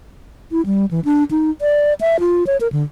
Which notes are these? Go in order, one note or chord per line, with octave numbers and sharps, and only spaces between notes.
E4
G3
E3
D4
D#4
D5
E5
F4
C#5
A#4
D3